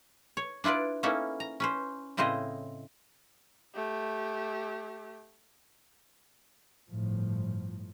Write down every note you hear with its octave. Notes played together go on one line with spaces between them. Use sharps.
C#5
D4 E4 F4 B4 D5
A#3 B3 C#4 D#4 E4 A4
A#5
C#4 B4 C5
A2 C#3 C4 E4 C5 D#5
A3 G4
G1 A2 F3